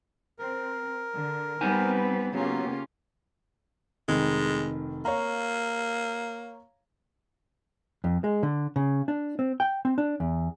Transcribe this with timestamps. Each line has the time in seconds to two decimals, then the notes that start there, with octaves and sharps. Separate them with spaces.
0.39 C4 A#4
1.11 D3
1.61 G3 B3 C4 D#4 B4 G#5
2.33 C#3 F#3 A#3 C#4 F4 G4
4.08 F1 D#3 G#3
5.05 A#3 C#5 F5 A#5
8.04 F2
8.24 G#3
8.43 D3
8.76 C#3
9.08 D4
9.39 C4
9.60 G5
9.85 C4
9.98 D4
10.20 E2